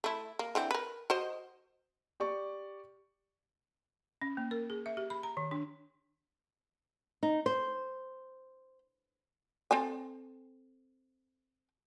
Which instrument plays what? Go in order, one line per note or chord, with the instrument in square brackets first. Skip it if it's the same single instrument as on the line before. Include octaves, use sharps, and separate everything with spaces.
[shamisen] A3 E4
A#3
D3 E3 C4
A#4 B4
F#4 C5 D#5
[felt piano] G4 D5 C#6
[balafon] C#4
A#3
A#4
G#4
E5
G4
B5
A#5
D#3
D4
[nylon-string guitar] D#4
C5
[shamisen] C4 A4 G#5